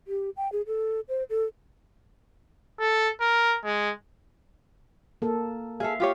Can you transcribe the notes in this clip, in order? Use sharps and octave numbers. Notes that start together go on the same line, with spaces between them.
G4
G5
G#4
A4
C5
A4
A4
A#4
G#3
A#3 A4
G#4 A4 E5 F5
F4 G4 C#5